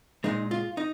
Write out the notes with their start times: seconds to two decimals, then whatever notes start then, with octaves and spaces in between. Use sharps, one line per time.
0.24 A#2 G#3 D#4
0.51 F4
0.77 D#4